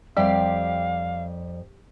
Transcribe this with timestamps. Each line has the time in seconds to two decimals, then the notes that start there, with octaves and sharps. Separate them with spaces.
0.17 F2 G3 G4 D5 F5 C6